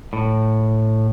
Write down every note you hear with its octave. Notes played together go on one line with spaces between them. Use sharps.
A2